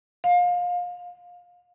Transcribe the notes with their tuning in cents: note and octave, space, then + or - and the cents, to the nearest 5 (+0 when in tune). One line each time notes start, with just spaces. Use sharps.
F5 +25